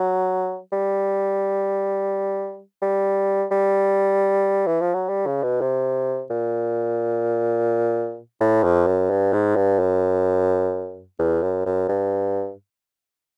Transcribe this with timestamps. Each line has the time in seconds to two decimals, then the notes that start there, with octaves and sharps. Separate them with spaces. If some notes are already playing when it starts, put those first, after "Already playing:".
Already playing: F#3
0.72 G3
2.82 G3
3.51 G3
4.67 E3
4.81 F3
4.95 F#3
5.09 G3
5.26 C#3
5.43 B2
5.61 C3
6.31 A#2
8.40 A2
8.64 F2
8.86 F#2
9.10 G2
9.33 G#2
9.56 G2
9.80 F#2
11.19 E2
11.43 F#2
11.66 F#2
11.89 G2